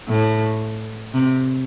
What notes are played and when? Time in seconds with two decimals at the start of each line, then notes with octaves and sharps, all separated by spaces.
0.09 A2
1.14 C3